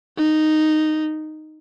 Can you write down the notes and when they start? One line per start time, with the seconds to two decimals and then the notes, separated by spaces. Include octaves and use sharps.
0.17 D#4